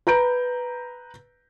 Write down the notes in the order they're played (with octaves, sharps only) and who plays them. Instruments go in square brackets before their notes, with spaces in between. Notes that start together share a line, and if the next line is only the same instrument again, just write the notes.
[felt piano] B4 A#5 G6 D7